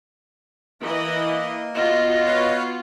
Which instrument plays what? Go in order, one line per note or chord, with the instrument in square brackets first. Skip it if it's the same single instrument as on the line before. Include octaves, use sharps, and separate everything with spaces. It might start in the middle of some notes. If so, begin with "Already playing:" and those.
[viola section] E3 D#5 [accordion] A#3
[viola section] B3 F4 F#4 [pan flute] D#5
[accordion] B4 C#5 F5